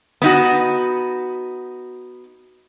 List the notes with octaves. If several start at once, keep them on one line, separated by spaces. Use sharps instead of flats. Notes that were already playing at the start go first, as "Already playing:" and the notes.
B3 D#4 F#4